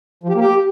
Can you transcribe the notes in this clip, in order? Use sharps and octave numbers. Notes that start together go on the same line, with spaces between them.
F3
G4
A#3
G4